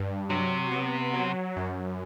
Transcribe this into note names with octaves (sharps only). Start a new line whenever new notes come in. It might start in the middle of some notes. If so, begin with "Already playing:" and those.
Already playing: G2
C3 F#3
B3
F#3
F#2